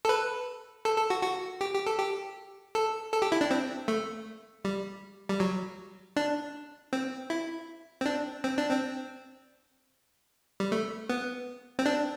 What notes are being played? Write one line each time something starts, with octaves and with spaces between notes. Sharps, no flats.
A4
B4
A4
A4
F#4
F#4
G4
G4
A4
G4
A4
A4
G4
E4
D4
C4
A3
G3
G3
F#3
D4
C4
E4
C4
D4
C4
D4
C4
G3
A3
B3
C4
D4